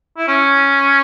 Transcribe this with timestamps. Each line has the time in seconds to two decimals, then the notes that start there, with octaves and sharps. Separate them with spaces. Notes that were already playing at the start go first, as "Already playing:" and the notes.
0.17 E4
0.28 C#4